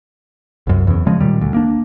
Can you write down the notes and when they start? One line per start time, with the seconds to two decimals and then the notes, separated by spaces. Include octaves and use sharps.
0.67 C2 F#2
0.87 E2 C#3
1.07 C#3 F3 G#3
1.20 A#2 D#3 G3
1.41 D2
1.54 A#3 D4